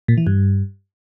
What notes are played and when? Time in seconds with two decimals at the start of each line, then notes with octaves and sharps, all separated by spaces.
0.08 A#2
0.18 E3
0.27 G2